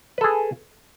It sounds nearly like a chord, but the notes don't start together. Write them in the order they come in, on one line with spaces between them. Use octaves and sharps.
B4 A4 G#4